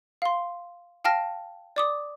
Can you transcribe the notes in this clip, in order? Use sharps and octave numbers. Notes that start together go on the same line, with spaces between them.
F5 C6
F5 G5 A5 F6 A#6
D5 D6 D#6